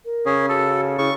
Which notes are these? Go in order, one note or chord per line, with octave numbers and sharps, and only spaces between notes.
A#4
C#3 C#4 G#4
F#4 A4
C#3 E4 C#6